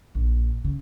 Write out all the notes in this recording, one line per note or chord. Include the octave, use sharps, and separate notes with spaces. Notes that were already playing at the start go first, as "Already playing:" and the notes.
A#1
C#3